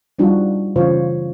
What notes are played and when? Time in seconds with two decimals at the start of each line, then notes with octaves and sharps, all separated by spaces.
0.19 F3 G3 D4 D#4 F4 F#4
0.76 C#3 E3 F#3 F4 C5 C#5